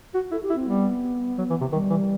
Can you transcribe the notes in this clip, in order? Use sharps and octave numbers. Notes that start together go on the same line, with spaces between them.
F#4
E4 A4
G4
E4
C4
G3 B3
F#3
E3
C3
D#3 G3
E3